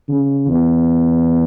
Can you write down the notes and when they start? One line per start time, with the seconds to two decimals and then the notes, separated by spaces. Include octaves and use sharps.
0.09 C#3
0.48 E2